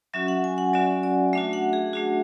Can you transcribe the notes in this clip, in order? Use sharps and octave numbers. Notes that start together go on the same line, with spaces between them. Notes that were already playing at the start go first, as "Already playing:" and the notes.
F#3 C#4 F#4 E5
F#5
G#5
F#5
F#3 C#4 F#4 D5
D5
A3 D4 F#4 E5
F#5
G#4
A3 D4 F#4